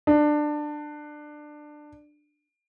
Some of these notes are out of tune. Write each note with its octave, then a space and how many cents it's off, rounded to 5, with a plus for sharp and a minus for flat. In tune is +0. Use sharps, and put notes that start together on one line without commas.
D4 +20